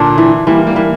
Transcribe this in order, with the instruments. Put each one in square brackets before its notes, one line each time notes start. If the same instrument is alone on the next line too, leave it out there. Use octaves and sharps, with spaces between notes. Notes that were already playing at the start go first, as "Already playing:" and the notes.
Already playing: [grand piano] A#2 D3 [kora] D4
[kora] E3
[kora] E3 [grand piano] G3 A#3
[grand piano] G3 A#3
[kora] E3